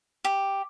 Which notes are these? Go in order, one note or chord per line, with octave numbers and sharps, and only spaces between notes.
G4